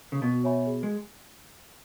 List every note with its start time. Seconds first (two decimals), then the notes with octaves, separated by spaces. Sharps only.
0.12 C#3
0.22 B2 F#4
0.44 C#5 E5 G#5 B5
0.66 G#4
0.83 G#3